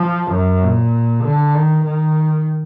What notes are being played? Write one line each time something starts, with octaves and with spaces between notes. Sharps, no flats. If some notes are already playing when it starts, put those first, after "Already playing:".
Already playing: F3
F#2
A#2
D3
D#3
D#3